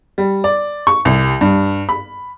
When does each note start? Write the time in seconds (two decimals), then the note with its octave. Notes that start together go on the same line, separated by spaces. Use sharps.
0.18 G3
0.44 D5
0.87 C#6
1.05 C2
1.41 G2
1.89 B5